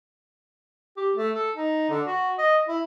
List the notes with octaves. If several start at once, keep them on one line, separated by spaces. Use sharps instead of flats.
G4
A3
A4
D#4
D3
F#4
D#5
E4